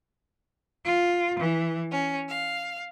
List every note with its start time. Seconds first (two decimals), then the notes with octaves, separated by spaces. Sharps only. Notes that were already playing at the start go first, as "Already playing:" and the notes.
0.85 F4
1.39 E3
1.93 C#4
2.29 F5